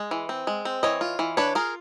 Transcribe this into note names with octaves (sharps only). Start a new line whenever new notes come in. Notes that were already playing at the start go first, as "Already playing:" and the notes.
Already playing: G#3
E3
C4
G#3
C4
E3 C#5 D#5
F4
E3
D4 B4 C#5
F4 G#4 A#4